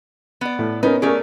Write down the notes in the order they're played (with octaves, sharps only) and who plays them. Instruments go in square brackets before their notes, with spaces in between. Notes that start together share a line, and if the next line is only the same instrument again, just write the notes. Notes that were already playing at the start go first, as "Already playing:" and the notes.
[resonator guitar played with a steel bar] B3 D5
[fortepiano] A2
[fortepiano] B3 C#4 A#4 [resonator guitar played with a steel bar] D#4
[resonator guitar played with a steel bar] A3 C#4 D5 [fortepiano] G#4 A#4